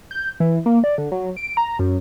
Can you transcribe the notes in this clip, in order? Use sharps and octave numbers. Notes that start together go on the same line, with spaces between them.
G6
E3
A#3
D5
D3
F#3
D7
A#5
F#2